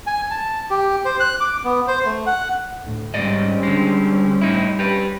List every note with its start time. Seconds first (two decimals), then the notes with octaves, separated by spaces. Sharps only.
0.07 G#5
0.31 A5
0.70 G4
1.05 C5
1.20 F#6
1.41 D6
1.64 B3
1.88 C5
2.05 A3
2.26 F#5
2.82 D2 A2
3.14 G#2 G3 C4 C#4 D5 D#5
3.63 D3 G#3
4.41 A2 D#4 E4
4.79 G4 B4